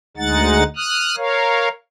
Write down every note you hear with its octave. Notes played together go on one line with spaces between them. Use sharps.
D2 G#3 D#4 F#5 A6
D#6 F6 F#6
A#4 C#5 F5